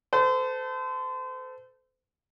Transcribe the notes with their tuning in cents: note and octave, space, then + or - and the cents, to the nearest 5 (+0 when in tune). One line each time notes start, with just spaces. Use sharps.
A4 +0 C5 -35